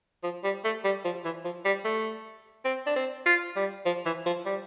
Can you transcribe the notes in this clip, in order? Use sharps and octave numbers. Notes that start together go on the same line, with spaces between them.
F3
G3
A3
G3
F3
E3
F3
G3
A3
C4
D4
C4
F4
G3
F3
E3
F3
G3